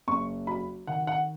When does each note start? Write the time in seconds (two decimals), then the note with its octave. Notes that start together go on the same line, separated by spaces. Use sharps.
0.08 F#1 C#6
0.47 F#3 B5
0.87 D#3 F#5
1.07 F#5